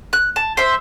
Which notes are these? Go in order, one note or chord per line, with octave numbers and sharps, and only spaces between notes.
F#6
A5
C5 E5